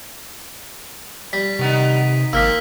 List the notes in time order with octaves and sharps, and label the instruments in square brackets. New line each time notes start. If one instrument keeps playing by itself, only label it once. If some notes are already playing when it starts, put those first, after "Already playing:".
[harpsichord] G3 [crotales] B6
[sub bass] C3 [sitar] D#3 B3 D#4
[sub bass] G#1 [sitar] F3 G4 [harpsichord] A#3 [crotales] E6 F6 B6